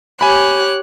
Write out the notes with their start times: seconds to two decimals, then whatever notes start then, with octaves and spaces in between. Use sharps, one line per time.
0.21 G4 C#5 G#5 B5 F#6